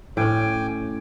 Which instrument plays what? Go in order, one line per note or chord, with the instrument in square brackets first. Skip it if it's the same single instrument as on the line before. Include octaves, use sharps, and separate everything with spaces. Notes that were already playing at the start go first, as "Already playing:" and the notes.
[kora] A2 C#4 [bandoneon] G5 G#5 D6